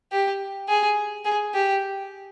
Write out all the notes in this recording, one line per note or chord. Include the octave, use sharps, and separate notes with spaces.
G4
G#4
G#4
G4